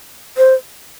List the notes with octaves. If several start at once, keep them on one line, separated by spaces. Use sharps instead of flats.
C5